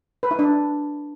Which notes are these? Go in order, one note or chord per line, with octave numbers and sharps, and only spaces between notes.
B4
E4
D4